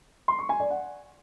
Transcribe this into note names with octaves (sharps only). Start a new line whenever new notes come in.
C6
C#6
G#5
D5
F#5